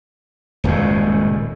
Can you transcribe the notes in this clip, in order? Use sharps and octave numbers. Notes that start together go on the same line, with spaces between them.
D#1 C#2 F#2 A2